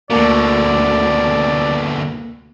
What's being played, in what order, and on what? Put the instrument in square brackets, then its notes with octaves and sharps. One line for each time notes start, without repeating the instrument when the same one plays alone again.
[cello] D2 [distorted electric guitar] B2 D3 [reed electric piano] A#3 [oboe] D5